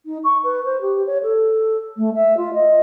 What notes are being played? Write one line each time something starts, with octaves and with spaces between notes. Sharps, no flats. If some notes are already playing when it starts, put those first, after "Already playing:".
D#4
C#6
B4
C5
G4
C#5
A4
A3
E5
F4
D#5